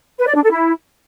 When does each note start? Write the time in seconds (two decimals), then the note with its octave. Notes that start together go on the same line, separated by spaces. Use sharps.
0.19 B4
0.27 D5
0.35 D4
0.43 A4
0.51 E4